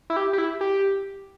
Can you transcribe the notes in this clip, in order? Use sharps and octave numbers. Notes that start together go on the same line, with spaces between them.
E4
G4
G4
E4
G4